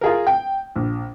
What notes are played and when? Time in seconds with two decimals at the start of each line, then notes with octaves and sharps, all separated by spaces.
0.01 F4 G#4 A#4
0.27 G5
0.76 A#1